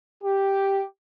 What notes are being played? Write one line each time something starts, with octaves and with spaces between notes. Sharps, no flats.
G4